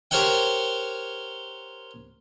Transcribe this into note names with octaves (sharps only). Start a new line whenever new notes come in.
G4 A#4 C5 C#5 F#5 G5